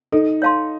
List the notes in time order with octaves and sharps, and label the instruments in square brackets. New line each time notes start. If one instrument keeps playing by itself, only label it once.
[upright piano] D#4 [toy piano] A4
[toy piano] C#5 F5 A5 C6